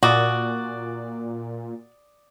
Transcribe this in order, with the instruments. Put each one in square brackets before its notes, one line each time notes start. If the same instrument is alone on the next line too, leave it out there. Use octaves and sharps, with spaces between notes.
[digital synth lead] A#2 [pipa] F#4 [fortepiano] D5 D6 D#6